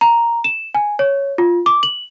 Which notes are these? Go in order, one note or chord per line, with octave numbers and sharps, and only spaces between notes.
A#5
E7
G#5
C#5
F4
D6
F#7